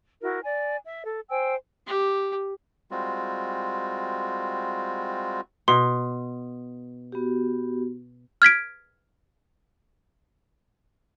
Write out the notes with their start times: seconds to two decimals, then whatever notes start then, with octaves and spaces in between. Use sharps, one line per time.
0.21 E4 F#4 A#4
0.44 D5 G#5
0.85 E5
1.04 A4
1.30 C5 G5 G#5 E6
1.87 G4
2.91 G3 G#3 C4 F4 F#4
5.68 B2 C6
7.12 B3 F#4 G4
8.42 F6 G#6 B6 D7